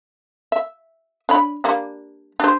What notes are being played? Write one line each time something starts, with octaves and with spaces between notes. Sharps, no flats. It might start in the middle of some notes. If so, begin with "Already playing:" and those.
E5
D4 C#5 B5
G3 A#3 D4
D4 G4 C5